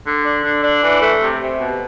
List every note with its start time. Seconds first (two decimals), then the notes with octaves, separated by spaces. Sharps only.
0.06 D3
0.25 D4
0.44 D3
0.64 D4
0.82 E3
1.02 A3
1.22 C3
1.40 C3
1.60 B2